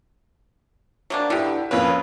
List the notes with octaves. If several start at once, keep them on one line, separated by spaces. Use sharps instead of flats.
F#3 A#3 D4
B2 D3 E4 G4
F2 A#3 C#4 B4